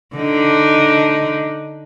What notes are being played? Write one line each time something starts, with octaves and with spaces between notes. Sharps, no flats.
D3 D#4